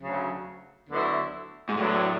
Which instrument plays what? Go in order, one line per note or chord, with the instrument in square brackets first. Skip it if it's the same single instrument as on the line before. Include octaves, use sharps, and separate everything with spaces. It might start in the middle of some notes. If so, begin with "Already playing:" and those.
[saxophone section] D2 C#3 F#3
D2 D3 F#3 B3 E4
[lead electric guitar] G#2
[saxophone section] E2 D3 F#3 [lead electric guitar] A2